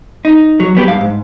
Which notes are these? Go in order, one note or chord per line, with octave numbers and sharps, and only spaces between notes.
D#4
F#3
F#3 B3 G4
G2 F5
G#2